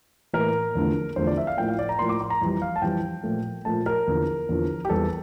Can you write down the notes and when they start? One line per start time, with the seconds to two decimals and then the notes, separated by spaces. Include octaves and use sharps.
0.33 A2 E3 A#3 A#4
0.75 E2 D3 F3 A3
1.16 E2 D3 F3 A3 C5
1.27 D5
1.37 E5
1.47 F5
1.58 A2 F3 A#3 G5
1.69 F5
1.79 D5
1.89 A#5
1.99 A2 F3 A#3 C6
2.09 D6
2.21 C6
2.30 A#5
2.42 F2 E3 G3
2.62 F5
2.76 A5
2.82 F2 E3 G3 G5
3.23 A#2 F3 A3
3.65 A#2 F3 A3 A5
3.86 A#4
4.07 E2 D3 F3 A#3
4.49 E2 D3 F3 A#3
4.85 G4
4.89 E2 E3 G3 A#3 A4